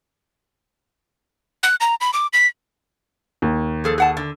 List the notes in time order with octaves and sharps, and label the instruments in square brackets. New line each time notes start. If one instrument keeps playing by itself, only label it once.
[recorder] F#6
A#5
B5
D6
B6
[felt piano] D#2
[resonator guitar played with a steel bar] F3 G#4 A4
G#4 F#5 A5
D3